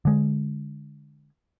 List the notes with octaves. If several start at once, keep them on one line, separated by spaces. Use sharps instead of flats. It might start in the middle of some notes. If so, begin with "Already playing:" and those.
D3 G#3